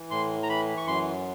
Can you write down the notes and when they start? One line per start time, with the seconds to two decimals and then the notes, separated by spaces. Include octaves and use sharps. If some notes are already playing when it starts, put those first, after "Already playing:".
Already playing: E3
0.11 A2 C6
0.43 A#5
0.49 E3 B5
0.77 C#6
0.87 F#2 C6